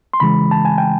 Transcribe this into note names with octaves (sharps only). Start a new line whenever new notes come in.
C6
C#3 E3 G#3 B5
A5
G#5
G5